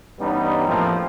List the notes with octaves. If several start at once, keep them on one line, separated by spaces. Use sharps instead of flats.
G2 E3 G3 B3 C#4 D#4
F2 A2 F3 A3 A#3 C4